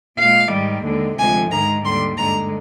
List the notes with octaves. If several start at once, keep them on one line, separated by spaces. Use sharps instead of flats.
A#2 G#3 F5
G#2 D#3 G3
D#2 D3 G#3
D2 C3 F3 G#3 G#5
G#2 D#3 G#3 A#5
D#2 D3 G3 C6
G2 D3 G#3 A#5